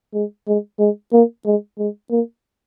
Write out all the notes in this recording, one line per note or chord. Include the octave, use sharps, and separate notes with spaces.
G#3
G#3
G#3
A#3
G#3
G#3
A#3